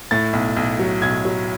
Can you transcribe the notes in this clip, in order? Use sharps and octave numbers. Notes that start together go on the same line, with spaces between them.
A2 A6
B1
B1
F#3
B1 G#6
F#3